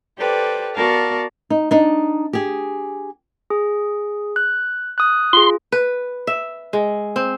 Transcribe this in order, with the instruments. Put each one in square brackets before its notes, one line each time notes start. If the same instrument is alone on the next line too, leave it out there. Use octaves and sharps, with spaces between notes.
[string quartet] G4 A4 B4 C5 D5
B3 F#4 A#4 D5 F5 A5
[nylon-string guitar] D#4
D4 D#4
G4 G#4
[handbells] G#4
F#6
D#6 F#6
[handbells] F4 G#4 [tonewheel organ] C6
[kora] B4
E5
G#3
C4